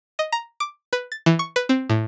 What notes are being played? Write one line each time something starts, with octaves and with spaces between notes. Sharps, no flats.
D#5
A#5
D6
B4
A6
E3
C#6
B4
C4
A2